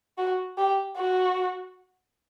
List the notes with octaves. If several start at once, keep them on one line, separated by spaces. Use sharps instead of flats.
F#4
G4
F#4